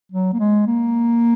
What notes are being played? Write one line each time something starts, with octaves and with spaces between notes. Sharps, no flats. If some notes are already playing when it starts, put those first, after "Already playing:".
F#3
A#3
G#3
A#3